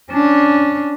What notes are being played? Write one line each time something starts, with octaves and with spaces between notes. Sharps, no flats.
C#4 D4